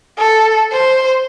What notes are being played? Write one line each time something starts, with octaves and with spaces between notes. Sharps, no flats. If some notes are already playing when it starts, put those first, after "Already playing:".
A4
C5